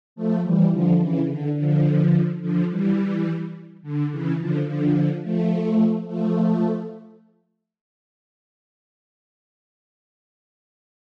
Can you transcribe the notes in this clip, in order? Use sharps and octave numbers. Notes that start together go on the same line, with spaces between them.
F3 A3
E3 G3
D3 F3
C#3 E3
D3
D3 F3
D3 F3
E3 G3
D3
C#3 E3
D3 F3
D3 F3
F3 A3
F3 A3